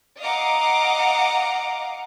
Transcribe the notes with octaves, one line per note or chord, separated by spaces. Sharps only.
D#5 F5 F#5 A#5 D6